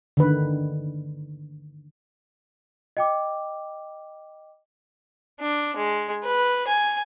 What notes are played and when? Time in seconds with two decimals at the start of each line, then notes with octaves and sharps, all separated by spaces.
0.17 D3 D#3 B4
2.97 D#5 G5 D6
5.40 D4
5.77 G#3
6.24 B4
6.67 G#5